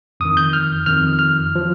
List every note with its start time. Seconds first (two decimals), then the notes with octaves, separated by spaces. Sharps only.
0.20 F2 D#3 D#6
0.37 G6
0.53 F6
0.86 F2 D#3 F6
1.19 F6
1.55 F3